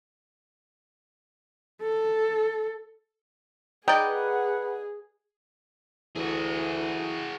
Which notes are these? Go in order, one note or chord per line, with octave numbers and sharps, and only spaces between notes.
A4
D#4 G#4 B4 D5 F#5 G5
D2 E3 F#4 G#4